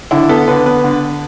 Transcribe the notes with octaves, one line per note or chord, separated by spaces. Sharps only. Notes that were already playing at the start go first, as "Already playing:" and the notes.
D3 E4
B3 A4
D3 B4
B3 B4
D3